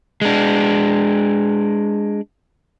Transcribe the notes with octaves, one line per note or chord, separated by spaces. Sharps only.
G#3 D4